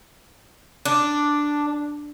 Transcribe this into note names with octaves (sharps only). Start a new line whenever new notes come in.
D4